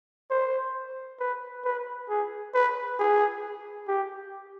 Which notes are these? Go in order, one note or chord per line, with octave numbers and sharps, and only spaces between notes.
C5
B4
B4
G#4
B4
G#4
G4